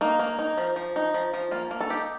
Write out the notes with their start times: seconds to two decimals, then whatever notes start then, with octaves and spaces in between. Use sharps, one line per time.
0.01 A#3 D#4
0.19 A#3
0.39 D#4
0.58 F3
0.76 F3
0.96 D#4
1.14 F3
1.34 F3
1.51 A#3 F4
1.71 A#3
1.81 A4
1.90 D#4 G4